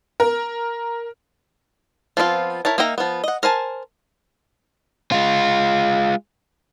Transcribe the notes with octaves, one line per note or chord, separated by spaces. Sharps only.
A#4
F3 B3 C4 E4 F4
E4 A#4 C#5 A5
A#3 D#4 E5 G5 A#5
F3 B3
D#5 F#5
A#4 C5 G#5 A5
G#3 F4